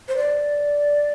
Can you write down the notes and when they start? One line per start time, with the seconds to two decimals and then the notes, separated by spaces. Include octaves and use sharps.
0.08 C5
0.17 D5